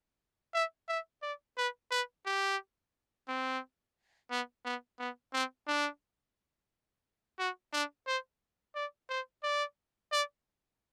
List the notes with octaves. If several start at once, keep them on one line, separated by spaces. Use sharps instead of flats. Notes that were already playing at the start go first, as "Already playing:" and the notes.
E5
E5
D5
B4
B4
G4
C4
B3
B3
B3
C4
D4
F#4
D4
C5
D5
C5
D5
D5